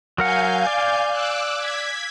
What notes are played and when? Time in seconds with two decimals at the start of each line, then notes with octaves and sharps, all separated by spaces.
0.18 F#3 A#4 F5 F#5 G#5 G6
0.67 D5
1.11 D6 E6 F#6
1.58 G#6 B6